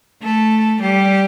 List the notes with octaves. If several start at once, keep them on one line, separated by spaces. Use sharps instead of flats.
A3 A4
G3 G4